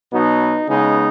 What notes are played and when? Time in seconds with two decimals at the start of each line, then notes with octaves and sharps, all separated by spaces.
0.13 B2 F#3 B3 D#4
0.68 C#3 G#3 B3 D#4